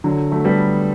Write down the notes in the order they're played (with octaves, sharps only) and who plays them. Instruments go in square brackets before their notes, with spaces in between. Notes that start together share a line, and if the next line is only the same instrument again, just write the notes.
[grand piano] D3 F#3
F#3 A3
G3 B3